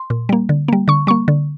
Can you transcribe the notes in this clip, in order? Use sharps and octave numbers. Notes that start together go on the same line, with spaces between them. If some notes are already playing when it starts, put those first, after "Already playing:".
Already playing: C6
A#2
G3 A#3
D3
G3 A#3
D3 C#6
G3 A#3 C#6
D3